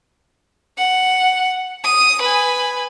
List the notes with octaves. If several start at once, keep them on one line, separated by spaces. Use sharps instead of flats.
F#5
D#6
B4 G#5